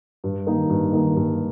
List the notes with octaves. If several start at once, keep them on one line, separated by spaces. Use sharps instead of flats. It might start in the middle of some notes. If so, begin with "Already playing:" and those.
G2
D#3 A#3 D#4
G2
D#3 A#3 D#4
G2